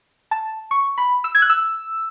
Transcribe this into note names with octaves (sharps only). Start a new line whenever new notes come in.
A5
C#6
B5
E6
G#6
F#6
E6